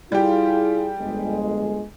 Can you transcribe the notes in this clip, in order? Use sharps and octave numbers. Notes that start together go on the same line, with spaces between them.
G3 E4 F4 G4 G#4
G1 F2 G#3